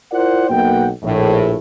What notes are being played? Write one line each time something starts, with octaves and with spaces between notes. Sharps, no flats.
E4 F4 A#4 C5 D5 F#5
B1 B2 A#3 F#5 G5
A#1 A2